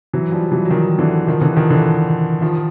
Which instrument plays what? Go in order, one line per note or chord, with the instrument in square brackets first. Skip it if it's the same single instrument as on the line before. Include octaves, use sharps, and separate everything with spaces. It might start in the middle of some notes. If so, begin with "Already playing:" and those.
[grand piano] E3 F#3
F3 G3
E3 F#3
F#3
D#3 F3
D3 E3
D#3 F3
D3 E3
D#3 F3
D3 E3
D#3 F3